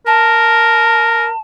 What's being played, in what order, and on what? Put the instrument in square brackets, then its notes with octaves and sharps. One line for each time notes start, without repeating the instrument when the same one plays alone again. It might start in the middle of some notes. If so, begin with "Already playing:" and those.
[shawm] A#4 [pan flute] A5